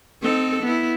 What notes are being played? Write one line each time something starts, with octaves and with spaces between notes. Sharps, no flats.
C4 D#4 A4
B3 E4